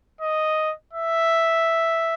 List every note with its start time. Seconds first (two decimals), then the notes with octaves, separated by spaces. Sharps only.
0.21 D#5
0.93 E5